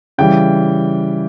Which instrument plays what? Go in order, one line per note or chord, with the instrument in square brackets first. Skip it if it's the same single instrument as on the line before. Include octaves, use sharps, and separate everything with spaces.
[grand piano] C#3 E3 G3 G5